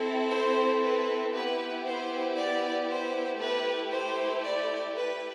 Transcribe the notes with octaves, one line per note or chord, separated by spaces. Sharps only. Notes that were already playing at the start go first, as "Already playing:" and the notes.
Already playing: C4 E4 A4
C5
B4
B3 E4 G4 B4
C5
D5
C5
A3 E4 G4 B4
C5
D5
B4